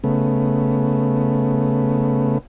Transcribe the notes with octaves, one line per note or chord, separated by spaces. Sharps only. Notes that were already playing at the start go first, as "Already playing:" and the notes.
C#3 A3 B3